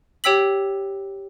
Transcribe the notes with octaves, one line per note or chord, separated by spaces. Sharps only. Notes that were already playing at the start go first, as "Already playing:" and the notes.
G4 C#5 G5 E6 B6 F#7